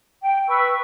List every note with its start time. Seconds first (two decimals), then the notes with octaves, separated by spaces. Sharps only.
0.22 G5
0.47 B4 B5 C#6 E6